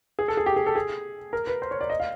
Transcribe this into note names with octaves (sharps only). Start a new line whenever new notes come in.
G#4
A4
G#4
G4
G#4
A4
G#4
A#4
B4
C5
C#5
D5
D#5
F5